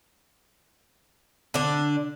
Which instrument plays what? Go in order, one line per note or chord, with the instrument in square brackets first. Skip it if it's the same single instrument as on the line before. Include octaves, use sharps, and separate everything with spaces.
[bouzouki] D3 D4